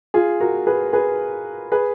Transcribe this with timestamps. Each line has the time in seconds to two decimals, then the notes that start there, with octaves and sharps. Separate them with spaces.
0.14 F4 G#4
0.40 F#4 A#4
0.67 G#4 B4
0.93 G#4 B4
1.72 G#4 B4